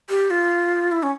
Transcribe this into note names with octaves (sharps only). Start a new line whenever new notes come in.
G4
F4
E4
C#4